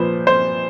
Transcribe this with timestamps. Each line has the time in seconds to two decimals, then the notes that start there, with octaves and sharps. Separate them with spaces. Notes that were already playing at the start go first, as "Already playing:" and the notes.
Already playing: A#2 F3 B4 C5
0.27 C5